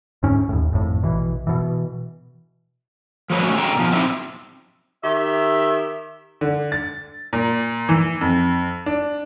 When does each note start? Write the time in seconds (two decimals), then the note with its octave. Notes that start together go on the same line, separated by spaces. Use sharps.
0.23 D2 G#2 C#4
0.49 D#2 A2
0.72 G#1 F2 A2
1.03 A#1 B2 E3
1.47 B2 E3
3.30 F3 A3 B4 C#5
3.43 A3 C#4 F#4
3.57 D3 G#4 G5 A#5
3.76 B2 F3
3.92 F#3 C4 D#4 E4 E5
5.03 D#3 G4 E5
6.41 D3
6.72 A6
7.33 A#2
7.89 E3
8.21 F2
8.86 D4